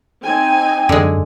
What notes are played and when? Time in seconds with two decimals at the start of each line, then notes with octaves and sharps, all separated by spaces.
0.24 C4 D#4 G5 G#5
0.89 F#2 D3 G#3